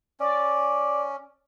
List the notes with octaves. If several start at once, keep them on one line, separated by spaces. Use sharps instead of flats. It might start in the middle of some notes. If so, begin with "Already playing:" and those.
C#4 D5